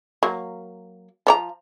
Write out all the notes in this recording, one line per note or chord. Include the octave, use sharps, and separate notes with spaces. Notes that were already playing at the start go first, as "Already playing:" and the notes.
F#3 A#3
F3 C#5 A#5